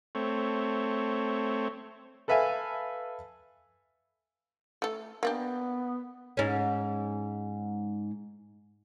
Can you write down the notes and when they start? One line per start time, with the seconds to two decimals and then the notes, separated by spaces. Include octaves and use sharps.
0.15 A3 C4 C#5
2.28 A4 B4 E5 F5 G#5
4.82 A3 A4
5.23 A#3 B3 D4 G4
6.37 G#2 C#4